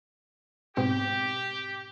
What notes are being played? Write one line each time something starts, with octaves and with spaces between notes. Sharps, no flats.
G#2 B2 C4 G4